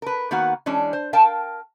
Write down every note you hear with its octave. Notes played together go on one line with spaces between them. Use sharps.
A#4 B4
D#3 A#3 B3 F#4 F#5
E3 G#3 C#4 D4
C5
A#4 F5 G5 A5